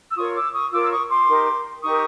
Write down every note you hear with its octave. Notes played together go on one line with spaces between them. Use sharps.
E6
F4 A#4 C#5 C#6 D#6
D6 E6
C#6 D#6
F4 A#4 C#5 D6 E6
E6
C#6 D#6
C6 D6
D#4 G4 A#4
D#4 G4 A#4 C#6 D#6